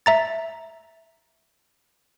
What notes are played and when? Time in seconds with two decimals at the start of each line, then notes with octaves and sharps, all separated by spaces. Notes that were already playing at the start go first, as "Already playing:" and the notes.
0.06 E5 A#5 A6